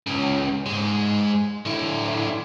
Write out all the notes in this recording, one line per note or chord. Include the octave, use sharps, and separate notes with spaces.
C#2 C#3
G#2 G#3
D3 E4